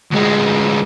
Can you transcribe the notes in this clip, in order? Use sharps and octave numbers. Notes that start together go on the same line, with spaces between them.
D2 G#3